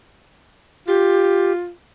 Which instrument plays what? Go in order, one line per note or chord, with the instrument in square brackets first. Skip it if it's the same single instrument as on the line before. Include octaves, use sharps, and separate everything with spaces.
[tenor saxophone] F4 [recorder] G4